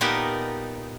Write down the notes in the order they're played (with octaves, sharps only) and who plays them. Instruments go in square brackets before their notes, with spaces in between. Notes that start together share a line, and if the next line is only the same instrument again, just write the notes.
[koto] A#2 B3 D#4 G4 A#4 A5